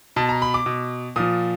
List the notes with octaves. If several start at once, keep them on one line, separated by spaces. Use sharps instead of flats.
B2 A5
A#5
B5
D6
B2
A#2 F3 D#6